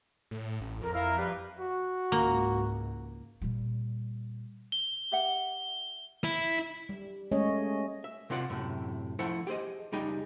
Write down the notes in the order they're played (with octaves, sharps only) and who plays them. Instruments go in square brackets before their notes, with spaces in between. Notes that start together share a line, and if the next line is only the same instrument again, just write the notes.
[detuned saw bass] A2
A1
[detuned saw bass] F2 [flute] A#4
[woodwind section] E4 A#4 [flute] F5
[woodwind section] G3 B4
[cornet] F#4
[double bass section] C#2 G#2 [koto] A#3
[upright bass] A#2 G3
[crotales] G7
[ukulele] G4 E5 F#5
[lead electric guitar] E4
[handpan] G3
G#3 A3 C#4 C#5 D#5
[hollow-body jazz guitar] E5
C3 C4 F4 D5 F#5
F#2 A2 C3
F3 A3 E4 C5 F#5
G4 G#4 C5 D#5
C#2 G3 D#4 G#4 G5